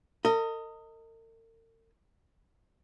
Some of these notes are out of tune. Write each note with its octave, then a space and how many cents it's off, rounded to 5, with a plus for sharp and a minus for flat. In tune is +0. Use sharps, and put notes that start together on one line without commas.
A#4 -45 D#5 +5